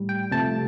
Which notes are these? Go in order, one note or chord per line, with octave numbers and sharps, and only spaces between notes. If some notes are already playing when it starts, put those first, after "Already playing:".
Already playing: A2 G3
G5
C3 F3 A3 A5